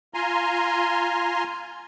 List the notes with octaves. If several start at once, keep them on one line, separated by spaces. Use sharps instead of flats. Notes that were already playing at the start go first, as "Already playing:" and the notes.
F4 G#5 A#5 C6